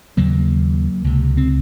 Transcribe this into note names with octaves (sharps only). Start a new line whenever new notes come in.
D#2 C#3 F#3 A#3
C#2 C3
C4